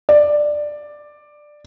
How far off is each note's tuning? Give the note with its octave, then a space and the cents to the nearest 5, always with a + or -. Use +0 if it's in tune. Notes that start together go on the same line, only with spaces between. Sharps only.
D5 +10